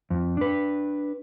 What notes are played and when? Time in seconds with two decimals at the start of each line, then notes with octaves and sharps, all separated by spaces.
0.10 F2
0.37 D4 B4